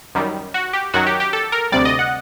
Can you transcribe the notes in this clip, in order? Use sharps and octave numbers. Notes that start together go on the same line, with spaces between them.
F#2 D#3 G3
F#4
G4
F#2 D#3 F#3 F#4
G4
G4
A4
A#4
D2 C3 G3 D5
D#5
F#5